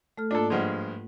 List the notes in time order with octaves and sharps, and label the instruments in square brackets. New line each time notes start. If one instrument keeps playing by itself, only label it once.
[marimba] A3 A4 F6
[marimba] G#2 A#3 F4 [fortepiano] D4 A4
[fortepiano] G2 F3 G#3 [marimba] D5 F#5